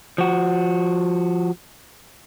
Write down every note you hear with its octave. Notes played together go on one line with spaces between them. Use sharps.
F3 F#4